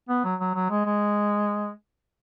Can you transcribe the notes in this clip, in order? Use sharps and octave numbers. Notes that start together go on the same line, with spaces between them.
B3
F#3
F#3
F#3
G#3
G#3